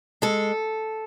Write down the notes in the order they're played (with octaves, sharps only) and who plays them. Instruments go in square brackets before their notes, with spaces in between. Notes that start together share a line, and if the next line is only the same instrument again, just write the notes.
[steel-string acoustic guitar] G#3 A4